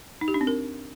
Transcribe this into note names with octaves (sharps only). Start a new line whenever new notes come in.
D#4
G4
D4
C4
A#4